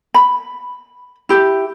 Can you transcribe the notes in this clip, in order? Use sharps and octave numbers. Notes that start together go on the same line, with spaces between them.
B5
E4 G4